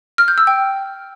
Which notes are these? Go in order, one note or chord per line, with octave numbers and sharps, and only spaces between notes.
F6
G6
E6
G5